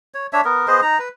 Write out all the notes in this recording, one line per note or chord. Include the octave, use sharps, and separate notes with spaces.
C#5
D4 C#5 E5
B3 A#4
B3 G#4 C5 D#5
D#4 A#5
B4